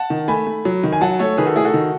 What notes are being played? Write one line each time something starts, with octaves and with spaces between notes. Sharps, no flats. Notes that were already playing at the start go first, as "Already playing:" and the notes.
Already playing: F#5 A5
D#3
A3 G#5 B5
A3
F#3
D#3
G#5
F#3 F#5 A5
A3 A4 C#5
D#3 G#4 B4
F#4 A4
A3 E4 G#4
F#4 A4
D#3